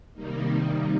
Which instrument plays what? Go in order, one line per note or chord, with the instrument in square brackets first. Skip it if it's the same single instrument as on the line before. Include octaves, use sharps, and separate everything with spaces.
[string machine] C3 D#3 G3 A#3 D#4